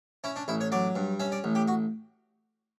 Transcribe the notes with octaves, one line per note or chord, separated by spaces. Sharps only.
C#4 E4
D4
A1 E4
C#5
F#3 D5
G2
C#4 E5
D5
A1
G4
F#4